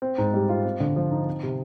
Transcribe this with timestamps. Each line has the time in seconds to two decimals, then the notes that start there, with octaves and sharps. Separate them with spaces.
0.02 C4
0.18 G#2
0.34 G3
0.49 F4
0.64 C4
0.80 D3
0.96 F3
1.11 D#4
1.27 C4
1.43 C3